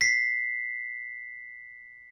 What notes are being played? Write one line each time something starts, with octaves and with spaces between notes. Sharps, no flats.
B6 C7